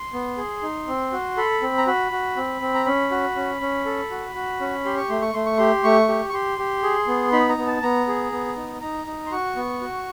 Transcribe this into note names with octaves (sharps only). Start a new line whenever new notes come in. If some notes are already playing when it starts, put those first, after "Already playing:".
Already playing: C6
B3
G#4
D#4
C4
F#4
A4 B5
C4
A#5
F#4 B5
F#4
C4
C4
A#5
C#4 B5
F#4
C#4
C#4
A4
F#4
F#4
C#4
G4 C6
C#6
A3 C6
C#6
A3 C6
C#6
G4 C6
A3 C#6
G4
C#6
G4 C6
G4
G#4
B3
D#4 B5
A#5
B3
A5
B3 A#5
G#4
B3
D#4
D#4 A#5
D#4
C6
F#4 C#6
B3
F#4